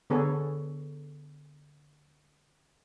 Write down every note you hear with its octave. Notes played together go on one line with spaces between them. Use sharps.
D3 B3 G#4 A4 C#5